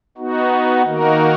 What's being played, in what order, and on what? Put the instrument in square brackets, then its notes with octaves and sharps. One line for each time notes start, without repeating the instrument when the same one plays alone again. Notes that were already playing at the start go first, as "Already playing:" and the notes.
[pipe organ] B3 D#4 F#4
D#3 A#3 D#4 F#4 A#4